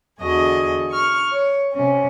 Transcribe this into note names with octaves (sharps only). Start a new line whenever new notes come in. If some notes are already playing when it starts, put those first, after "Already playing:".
E2 D3 F#4 G#4 D#5
C#6 F6
C#5
C3 C#4